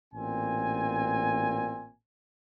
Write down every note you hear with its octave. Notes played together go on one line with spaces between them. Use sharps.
A1 A#2 C4 G#5